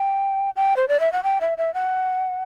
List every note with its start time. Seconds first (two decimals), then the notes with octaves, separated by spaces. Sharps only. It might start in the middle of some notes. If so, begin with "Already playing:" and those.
Already playing: G5
0.56 G5
0.76 C5
0.88 D5
1.00 E5
1.12 F#5
1.23 G5
1.41 E5
1.58 E5
1.74 F#5